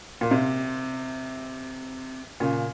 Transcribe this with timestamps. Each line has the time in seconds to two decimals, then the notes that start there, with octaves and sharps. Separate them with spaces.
0.21 A#2
0.31 C3
2.40 A#2 C#3